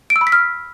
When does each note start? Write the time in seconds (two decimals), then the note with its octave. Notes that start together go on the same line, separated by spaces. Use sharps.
0.10 D7
0.16 E6
0.21 B5
0.27 B6
0.32 F6